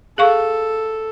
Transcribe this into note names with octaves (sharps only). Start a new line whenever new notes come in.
G#4 A4 F5 C#6